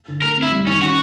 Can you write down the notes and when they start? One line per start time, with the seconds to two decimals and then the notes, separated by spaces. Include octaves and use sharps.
0.08 D3
0.22 A3 A#4
0.37 C4 E4
0.52 G3
0.67 D#3 C#4
0.81 C#4 F#4